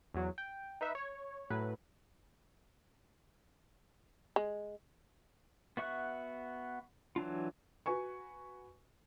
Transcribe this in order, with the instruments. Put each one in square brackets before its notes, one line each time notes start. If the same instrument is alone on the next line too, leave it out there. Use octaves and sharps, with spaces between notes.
[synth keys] E2 F#3
G5
D#4 B4 E5
C#5
A2 F#3 B4
[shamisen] G#3
[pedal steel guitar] B3 F#4 E5 C#6 F#6
E3 F#3 D4 F4
[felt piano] F#4 B4 G#5 C#6